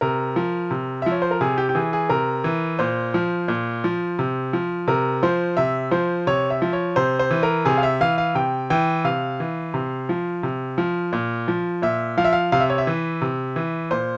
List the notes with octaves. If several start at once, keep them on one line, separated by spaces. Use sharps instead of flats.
C3 A#4
F3
C3
F3 E5
C#5
C5
A#4
C3 G#4
G4
G4
E3 G#4
G#4
C3 A#4
E3
A#2 C5
F3
A#2
F3
C3
F3
C3 A#4
F3 C5
C3 E5
F3 C5
C3 C#5
E5
F3
C#5
C3 C5
C5
E3
A#4
C3 G#4
F5
E5
E3 F5
F5
C3 G5
E3 G5
C3 F5
E3
C3
F3
C3
F3
A#2
F3
A#2 E5
F3 F5
E5
F5
C3 F5
E5
C#5
E5
E3
C3
E3
A#2 C5